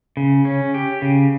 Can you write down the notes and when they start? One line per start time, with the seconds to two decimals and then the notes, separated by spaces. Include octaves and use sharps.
0.17 C#3
0.45 C#4
0.74 G4
1.02 C#3